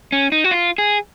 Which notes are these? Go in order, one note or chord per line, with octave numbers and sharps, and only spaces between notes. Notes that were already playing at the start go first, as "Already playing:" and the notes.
C#4
D#4
F#4
F4
G#4